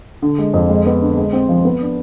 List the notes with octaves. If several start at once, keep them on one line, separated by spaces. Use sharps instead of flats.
D3
G#3
F2
G#3
B3
D3
G#3
C4
F3
B3
D4